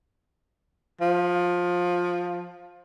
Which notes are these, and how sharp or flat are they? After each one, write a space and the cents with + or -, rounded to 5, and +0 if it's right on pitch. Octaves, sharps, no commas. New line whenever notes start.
F3 +15